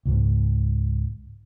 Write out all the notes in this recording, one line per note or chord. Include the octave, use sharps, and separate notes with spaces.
C#2 G#2